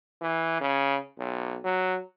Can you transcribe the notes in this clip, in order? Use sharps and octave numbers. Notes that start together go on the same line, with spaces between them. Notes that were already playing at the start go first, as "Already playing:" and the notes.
E3
C#3
B1
F#3